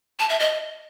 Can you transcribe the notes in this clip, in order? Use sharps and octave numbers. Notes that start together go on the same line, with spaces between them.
A5
E5
D#5